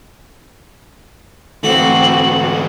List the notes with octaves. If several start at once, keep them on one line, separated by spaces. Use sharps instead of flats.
G#2 E3 A3 C4 F#4 F#7